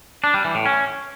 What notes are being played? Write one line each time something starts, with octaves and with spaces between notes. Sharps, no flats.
D4
G3
E3
A2
C#4